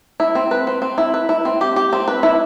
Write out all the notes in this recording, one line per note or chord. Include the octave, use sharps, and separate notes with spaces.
E4
C4
B4
C4
C4
E4
B4
E4
C4
G4
G4
C4
B4
E4